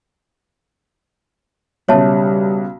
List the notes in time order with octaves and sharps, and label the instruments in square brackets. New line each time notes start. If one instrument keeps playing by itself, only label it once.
[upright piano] B1 C#3 [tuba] G3 [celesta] C#5 E5 A5